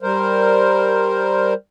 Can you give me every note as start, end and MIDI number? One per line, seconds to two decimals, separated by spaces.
0.02 1.54 55
0.02 1.54 70
0.02 1.54 72